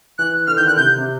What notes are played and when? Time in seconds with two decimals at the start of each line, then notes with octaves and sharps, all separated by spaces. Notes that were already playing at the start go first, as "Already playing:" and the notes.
0.18 E3 F#6
0.47 D3 F6
0.57 D#3 G6
0.66 D3 F#6
0.77 C3 G6
0.98 C3